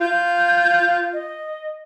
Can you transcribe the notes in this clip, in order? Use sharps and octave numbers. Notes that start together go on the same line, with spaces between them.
F4 G6
D#5